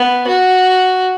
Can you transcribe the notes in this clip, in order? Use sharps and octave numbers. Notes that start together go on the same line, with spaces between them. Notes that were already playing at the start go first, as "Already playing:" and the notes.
Already playing: B3
F#4